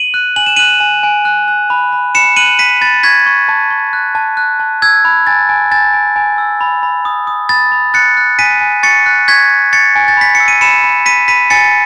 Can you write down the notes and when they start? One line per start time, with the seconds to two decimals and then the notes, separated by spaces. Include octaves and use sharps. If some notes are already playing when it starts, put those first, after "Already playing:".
Already playing: D#7 F#7
0.14 F#6
0.36 G#5 F#7
0.46 E7
0.56 F#6 D#7 F#7
0.80 G#5
1.03 G#5
1.25 F#6
1.48 F#6
1.70 B5
1.92 B5
2.15 B5 C#7 E7
2.36 F#6 D#7 F#7
2.59 B5 B6 D#7
2.81 B5 A6
3.03 C#6 G#6 B6
3.26 C#6
3.48 A5
3.71 C#6
3.93 F#6
4.15 A5
4.37 F#6
4.60 A5
4.82 E6 G#6
5.05 B5
5.27 G#5 A6
5.49 G#5
5.71 G#5 A6
5.93 G#5
6.16 G#5
6.38 E6
6.61 B5
6.83 B5
7.05 D#6
7.27 D#6
7.49 B5 A6
7.72 B5
7.94 F#6 A6 C#7
8.17 F#6
8.39 G#5 B6 D#7
8.61 G#5
8.83 C#6 A6 C#7
9.06 F#6
9.28 C#6 G#6 B6
9.50 C#6
9.72 C#6 A6 C#7
9.95 G#5
10.08 A6
10.17 B5 B6
10.35 C#7
10.40 E6
10.48 D#7
10.61 B5 C#7 E7
10.84 B5
11.06 B5 B6 D#7
11.28 B5 B6 D#7
11.50 G#5 A6 C#7